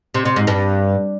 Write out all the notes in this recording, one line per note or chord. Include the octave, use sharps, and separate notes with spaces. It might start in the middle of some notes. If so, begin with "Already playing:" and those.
C3
C3
G#2
G2